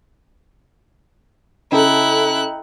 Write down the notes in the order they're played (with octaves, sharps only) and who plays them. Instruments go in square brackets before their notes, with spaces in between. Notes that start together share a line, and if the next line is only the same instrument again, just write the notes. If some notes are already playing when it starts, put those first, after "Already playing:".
[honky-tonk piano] C#3 A4 [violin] E4 F#6 [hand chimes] D#5 G5 A#5